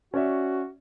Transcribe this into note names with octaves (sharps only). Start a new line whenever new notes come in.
C#4 F#4 D5 E5